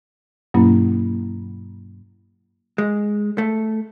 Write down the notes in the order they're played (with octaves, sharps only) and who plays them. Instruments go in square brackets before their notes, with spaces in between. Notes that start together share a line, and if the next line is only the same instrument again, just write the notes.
[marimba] G2 B2 F#3 A#3 C#4 E4
[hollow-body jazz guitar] G#3
A3